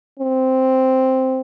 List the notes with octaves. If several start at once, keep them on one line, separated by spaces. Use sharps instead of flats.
C4